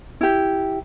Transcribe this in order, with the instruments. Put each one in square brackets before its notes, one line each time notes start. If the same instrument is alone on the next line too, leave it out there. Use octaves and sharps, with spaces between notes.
[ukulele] E4 G4